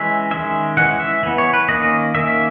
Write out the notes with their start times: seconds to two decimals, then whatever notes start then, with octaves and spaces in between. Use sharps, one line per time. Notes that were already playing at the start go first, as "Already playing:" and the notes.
Already playing: E3 G#3 C#4 E5
0.31 D#3 G#3 C#4 E5
0.77 E3 G#3 C#4 F#5
1.00 E5
1.23 E3 B3
1.38 C#5
1.53 B4
1.68 D#3 A#3 C#4 D#5
2.15 D#3 A#3 C#4 E5